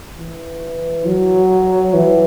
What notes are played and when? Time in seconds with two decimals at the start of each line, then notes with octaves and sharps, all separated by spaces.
0.17 E3
1.06 F#3
1.94 E3